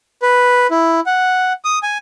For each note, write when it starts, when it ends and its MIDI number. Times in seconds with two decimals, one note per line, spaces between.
0.22 0.67 71
0.71 1.00 64
1.06 1.53 78
1.65 1.79 87
1.83 1.98 80